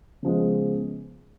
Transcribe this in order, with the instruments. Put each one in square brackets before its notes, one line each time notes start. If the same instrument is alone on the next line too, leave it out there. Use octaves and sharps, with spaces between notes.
[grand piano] C#3 F3 G#3 B3